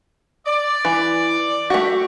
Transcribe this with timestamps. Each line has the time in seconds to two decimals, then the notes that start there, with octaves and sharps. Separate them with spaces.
0.47 D5
0.85 E3
1.70 A3 F#4 G4